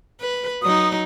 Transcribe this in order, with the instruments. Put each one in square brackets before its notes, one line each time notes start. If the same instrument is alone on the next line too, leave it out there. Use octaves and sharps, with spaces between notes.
[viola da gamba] B4
[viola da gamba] F#3 D#4 [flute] D#6